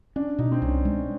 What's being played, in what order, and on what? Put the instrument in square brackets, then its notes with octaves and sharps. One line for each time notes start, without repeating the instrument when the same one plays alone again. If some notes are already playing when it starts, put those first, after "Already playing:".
[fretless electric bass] C#4 [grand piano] D4
[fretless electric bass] B2 [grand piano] D#4
[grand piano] C4
[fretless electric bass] C2 [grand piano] C#4
[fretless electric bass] G#3